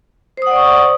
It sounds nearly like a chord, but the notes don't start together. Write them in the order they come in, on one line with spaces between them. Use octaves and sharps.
C5 D#6 F#5 D5 C#6